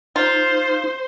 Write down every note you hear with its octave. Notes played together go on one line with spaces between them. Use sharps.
D#4 F4 C5